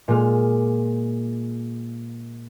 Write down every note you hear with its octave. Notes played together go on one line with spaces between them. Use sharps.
A#2 G#3 F6